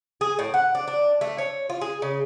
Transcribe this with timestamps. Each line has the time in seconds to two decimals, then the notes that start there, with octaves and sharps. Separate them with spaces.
0.21 G#4
0.39 A2
0.54 F#5
0.75 D4
0.88 D4
1.21 A3
1.38 C#5
1.70 F4
1.81 G#4
2.02 C#3